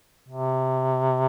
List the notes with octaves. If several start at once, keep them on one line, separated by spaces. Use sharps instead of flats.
C3